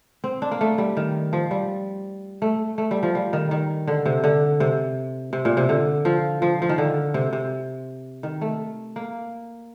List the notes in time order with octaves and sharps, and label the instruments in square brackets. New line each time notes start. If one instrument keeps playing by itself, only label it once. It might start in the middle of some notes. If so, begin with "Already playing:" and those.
[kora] C4
D4
A#3
A3
G3
D#3
F3
G3
A3
A3
G3
F3
G3
D#3
D#3
D3
C3
D3
C3
C3
A#2
C3
D3
F3
F3
F3
D#3
D3
C3
C3
D#3
A3
A#3